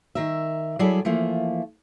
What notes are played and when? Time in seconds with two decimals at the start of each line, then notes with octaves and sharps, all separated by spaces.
0.15 D#3 A#4 E5
0.79 F#3 G3 E4 G#4 A4 D5
1.05 E3 F3 A3 A#3